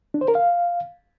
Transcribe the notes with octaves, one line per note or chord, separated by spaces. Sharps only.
D4
C5
A#4
F5